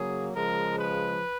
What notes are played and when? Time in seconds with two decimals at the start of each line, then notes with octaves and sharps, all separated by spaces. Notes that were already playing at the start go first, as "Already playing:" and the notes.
Already playing: C#3 F#3 A#3 G#4
0.33 C#3 F3 G#3 A#4
0.78 B4